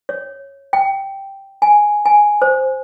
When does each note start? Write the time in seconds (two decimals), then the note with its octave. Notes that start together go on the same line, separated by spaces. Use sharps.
0.09 C#5
0.73 G5
1.62 G#5
2.06 G#5
2.42 C5